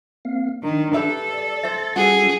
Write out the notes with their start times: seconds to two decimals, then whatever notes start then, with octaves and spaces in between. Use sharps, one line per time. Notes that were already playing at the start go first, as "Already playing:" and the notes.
0.25 A#3 C4 F5
0.63 D#3 D4
0.94 G4 A4 B4 E5
1.29 D5
1.63 C5 E5 A6
1.96 G3 C#4 F4 F#4 G#4 F#5